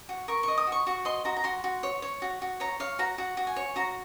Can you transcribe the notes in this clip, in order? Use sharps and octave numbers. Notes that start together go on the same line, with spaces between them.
F#4
A#4 C#6
D#5 C#6
D#6
F#4 C#6
F#4 C#6
D#5 C6
F#4 A#5
A#5
F#4 C6
F#4
C#5
C#5
F#4
F#4
C#5 A#5
C#5 F5
F#4 A#5
F#4 F#5
F#4
G#5
C#5
F#4 A#5